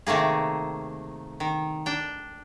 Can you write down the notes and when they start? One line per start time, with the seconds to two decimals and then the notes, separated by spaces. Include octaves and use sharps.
0.07 C3 D#3 A3 A#3 G#4
1.40 D#3
1.86 D4 G5